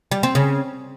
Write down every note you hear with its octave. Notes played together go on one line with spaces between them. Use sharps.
G3
C4
C#3